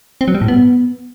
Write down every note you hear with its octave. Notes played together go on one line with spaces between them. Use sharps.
C4
F#3
G3
A2
B3